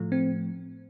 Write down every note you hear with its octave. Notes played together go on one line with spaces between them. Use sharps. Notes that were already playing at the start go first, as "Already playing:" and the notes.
Already playing: A2 F3 A3
C4